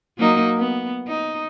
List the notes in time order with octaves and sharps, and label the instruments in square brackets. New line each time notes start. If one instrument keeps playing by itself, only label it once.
[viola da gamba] F#3 A#3 D#4
B3
D#4